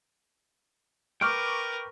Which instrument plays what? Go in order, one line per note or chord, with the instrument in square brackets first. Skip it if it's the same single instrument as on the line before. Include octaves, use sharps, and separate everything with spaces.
[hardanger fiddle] A#4 B4 [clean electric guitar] G5 [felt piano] C#6 D6 F6